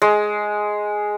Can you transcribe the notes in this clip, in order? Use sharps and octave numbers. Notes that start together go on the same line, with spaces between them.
G#3